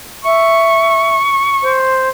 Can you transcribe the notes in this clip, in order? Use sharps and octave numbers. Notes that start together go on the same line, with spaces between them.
E5 C#6
C5